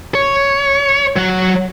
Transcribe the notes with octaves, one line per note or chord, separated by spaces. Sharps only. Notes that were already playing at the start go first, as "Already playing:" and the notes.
C#5
F#3 F#5